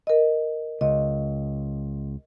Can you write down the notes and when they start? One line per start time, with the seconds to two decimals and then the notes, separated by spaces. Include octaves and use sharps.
0.07 A#4 D#5
0.81 C#2 D#5